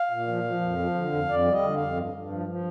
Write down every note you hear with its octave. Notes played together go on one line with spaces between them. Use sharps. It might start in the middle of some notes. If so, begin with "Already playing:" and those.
Already playing: F5
A#2
F3
F3
F2
F3
D3
F2
F2 D5
G3
D#5
D3
F2 F5
G2
G2
F3
F3